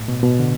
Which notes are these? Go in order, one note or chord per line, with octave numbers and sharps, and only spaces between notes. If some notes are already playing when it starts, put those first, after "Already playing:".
Already playing: A2
B2
B2
D3